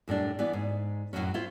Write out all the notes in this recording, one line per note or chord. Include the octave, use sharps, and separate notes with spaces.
F#2 A2 G3 D4
E3 B3 D5
G#2
F#2 A2 E3 F#3 C#4
E4 F4 C5